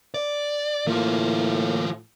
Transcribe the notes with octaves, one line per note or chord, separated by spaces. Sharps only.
D5
A2 E3 A#3 F4